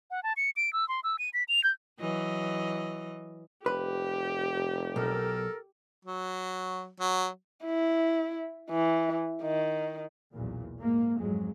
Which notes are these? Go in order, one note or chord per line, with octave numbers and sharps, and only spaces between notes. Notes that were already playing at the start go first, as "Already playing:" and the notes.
F#5
A5
C#7
D7
E6
C6
E6
D#7
B6
F7
G6
E3 F#3 D#5
F1 G4 B4
B1 A4 A#4
F#3
F#3
E4
E3
D#3
B1 E2 A#2
G#2 A#3
F2 G#2 F#3 G#3